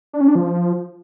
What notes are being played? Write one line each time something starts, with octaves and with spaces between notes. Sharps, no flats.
D4
C#4
D4
F3